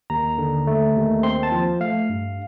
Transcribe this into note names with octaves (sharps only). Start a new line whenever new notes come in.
D#2 A#5
D3
A3
D#2
C4 C6
A5
F3
A3 F5
G2